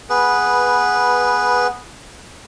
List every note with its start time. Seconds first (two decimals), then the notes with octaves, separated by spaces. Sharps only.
0.10 B3 G#4 B4